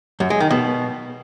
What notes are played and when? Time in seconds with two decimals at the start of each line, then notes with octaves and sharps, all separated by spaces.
0.20 F#2
0.30 G#3
0.40 D#3
0.51 B2